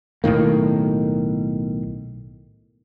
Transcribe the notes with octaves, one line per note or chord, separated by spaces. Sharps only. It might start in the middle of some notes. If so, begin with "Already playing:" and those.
B1 A2 D#3 A#3